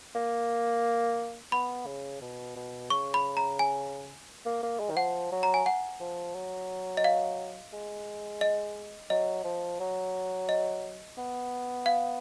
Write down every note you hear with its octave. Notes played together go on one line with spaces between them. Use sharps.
A#3
B3 B5
C#3
B2
B2
C#3 C#6
B5
A#5
G#5
A#3
A#3
G#3
D#3
F3 F#5
F#3
A#5
G#5
F#5
F3
F#3
D#5
F5
G#3
D#5
F#3 D#5
F3
F#3
D#5
B3
F5